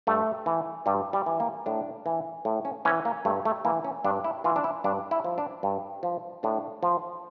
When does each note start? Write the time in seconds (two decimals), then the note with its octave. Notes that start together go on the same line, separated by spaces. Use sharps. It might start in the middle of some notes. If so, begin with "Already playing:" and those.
0.07 G2 A3
0.46 E3
0.86 G2 G3
1.13 G3
1.26 E3
1.40 A#3
1.66 A2 D4
2.06 E3
2.45 A2
2.65 C#4
2.85 E3 C#4
3.05 A#3
3.25 G2 A3
3.45 A3
3.65 E3 A#3
3.85 C#4
4.04 G2 D4
4.24 E4
4.44 E3 F4
4.56 D4
4.64 E4
4.84 G2 D4
5.11 E4
5.24 F3
5.38 D4
5.63 G2
6.03 F3
6.43 A2 D4
6.83 F3